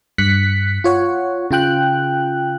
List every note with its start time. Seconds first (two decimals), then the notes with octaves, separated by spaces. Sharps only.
0.18 G2 F#6 B6 C#7
0.84 F4 C#5 F#5
1.51 C#3 F4 G5 F#6